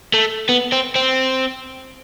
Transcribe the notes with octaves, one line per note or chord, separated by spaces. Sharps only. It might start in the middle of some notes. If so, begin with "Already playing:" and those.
A3
B3
C4
C4